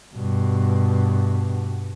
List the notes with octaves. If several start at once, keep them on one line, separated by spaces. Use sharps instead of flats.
G2 B2